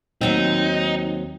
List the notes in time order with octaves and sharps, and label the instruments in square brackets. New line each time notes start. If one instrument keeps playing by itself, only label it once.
[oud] D#2 F#3 C4 [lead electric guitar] D#4